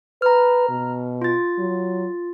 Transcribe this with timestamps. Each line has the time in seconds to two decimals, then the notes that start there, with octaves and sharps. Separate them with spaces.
0.22 B4 A#5 F6
0.70 B2
1.22 F4 A6
1.59 F#3